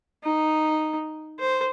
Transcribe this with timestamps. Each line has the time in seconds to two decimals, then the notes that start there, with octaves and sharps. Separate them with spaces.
0.24 D#4
1.40 C5